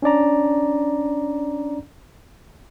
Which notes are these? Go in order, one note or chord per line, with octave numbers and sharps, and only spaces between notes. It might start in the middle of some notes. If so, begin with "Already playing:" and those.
C#4 D4 D5 A#5